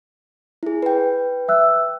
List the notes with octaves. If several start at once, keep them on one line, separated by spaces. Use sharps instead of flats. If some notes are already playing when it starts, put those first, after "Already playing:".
E4 G#4
B4 G5
E5 E6 F#6